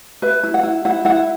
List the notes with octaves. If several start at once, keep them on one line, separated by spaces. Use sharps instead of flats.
B4 E5
E4
F#5
E4
E4 F#5
E4 F#5